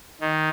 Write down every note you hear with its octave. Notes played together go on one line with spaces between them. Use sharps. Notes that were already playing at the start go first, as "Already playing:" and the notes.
D#3